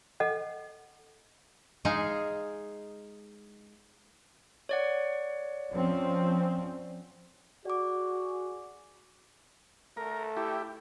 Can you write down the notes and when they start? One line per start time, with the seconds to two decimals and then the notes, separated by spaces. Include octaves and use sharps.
0.20 A4 D#5 F#5
1.85 G#3 D#4 G#4 F5
4.69 C#5 D5 F#5
5.71 F3 C4 C#4
7.65 F#4 G#4 D5 D6
9.97 A3 A#4
10.37 E4 G4